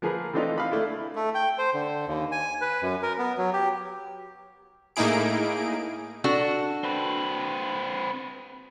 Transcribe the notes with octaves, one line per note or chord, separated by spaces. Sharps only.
F3 A#3 G#4 A#4 B4
E3 A3 C4 D4 D#4 F4
F5 B5
A3 D4 E4
A3
G5
C5
D3
D#2
G#5
B4
F#2
A#4
B3
F#3
G4
A2 A#3 D#4 E4 G#4 D7
D4 F#4 A4
C4 B4